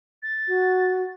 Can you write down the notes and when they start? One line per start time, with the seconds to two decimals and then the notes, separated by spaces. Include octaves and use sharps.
0.23 A6
0.48 F#4